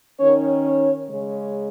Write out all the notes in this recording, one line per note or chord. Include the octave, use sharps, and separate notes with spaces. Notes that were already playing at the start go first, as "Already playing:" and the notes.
D#3 C#4 C#5
C#5
C#3 G#3 C#4